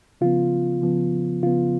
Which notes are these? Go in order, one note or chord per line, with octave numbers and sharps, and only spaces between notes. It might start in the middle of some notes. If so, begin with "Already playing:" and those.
C#3 F3 B3 F4
C#3 F3 B3
C#3 F3 B3 F4